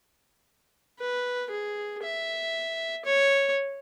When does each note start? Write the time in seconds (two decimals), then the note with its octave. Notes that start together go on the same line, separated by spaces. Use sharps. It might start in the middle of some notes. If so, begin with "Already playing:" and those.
0.99 B4
1.50 G#4
2.02 E5
3.05 C#5